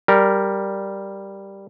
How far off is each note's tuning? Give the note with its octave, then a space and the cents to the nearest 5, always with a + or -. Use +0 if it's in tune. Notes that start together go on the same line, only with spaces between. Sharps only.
G3 +0 A#4 +0